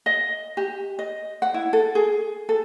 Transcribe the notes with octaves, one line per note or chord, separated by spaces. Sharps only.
D#5
G4
D#5
F#5
E4
A4
G#4
A4